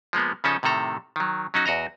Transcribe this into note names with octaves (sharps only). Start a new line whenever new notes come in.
F3 G#3 A#3 B3
C#3 F3 C#4 D#4 A4
A2 C3 D#3 A4 A#5
D#3 F#3
F#3 C#4 D#4 F#4
E2 F#4 D#5 A#5